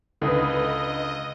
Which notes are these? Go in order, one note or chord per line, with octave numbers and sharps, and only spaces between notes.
C#2 D3 B4 D#5